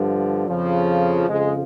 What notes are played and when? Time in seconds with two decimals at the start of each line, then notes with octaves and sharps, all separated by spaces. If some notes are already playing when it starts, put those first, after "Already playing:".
Already playing: G2 D3 F3
0.47 F2 C#3 F3
1.28 F2 C#3 F3 G#3